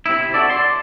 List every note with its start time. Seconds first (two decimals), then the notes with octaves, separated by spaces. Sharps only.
0.06 C3 E4
0.34 E4 F#4 A4 D5
0.50 D5 C6